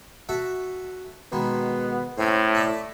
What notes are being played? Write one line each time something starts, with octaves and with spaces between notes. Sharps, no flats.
F#4 A4 E5
B2 D#3 G#3 B3
A2 C4 C#4 G#5
D5 E5 A5